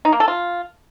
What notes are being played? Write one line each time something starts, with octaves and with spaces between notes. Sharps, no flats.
D#4
A#3
A4
F4